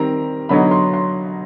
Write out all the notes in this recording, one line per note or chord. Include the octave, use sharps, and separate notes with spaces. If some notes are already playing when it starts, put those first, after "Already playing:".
Already playing: D#3 G3 C4 A#5
D3 F#3 B3 D#4 B5
C6
C6